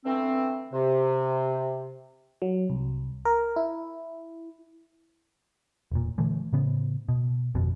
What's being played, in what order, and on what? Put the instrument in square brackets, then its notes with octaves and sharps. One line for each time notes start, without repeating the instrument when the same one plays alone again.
[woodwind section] D3 E3 A3 B3 C4
C3
[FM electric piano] F#3
C2
A#4
E4
[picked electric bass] E1 A#2
A#2 D3 E3 A3
A2 C#3 B3
B2
G1 F2 B2